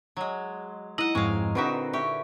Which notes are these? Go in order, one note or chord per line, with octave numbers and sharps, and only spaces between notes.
F#3 G#3
D#4 E4 D#5 F#5
F2 G#2 G#3 C4 C#5 F5
A#2 D3 C4 D#4 F#4 B4 E5
G4 E5 C#6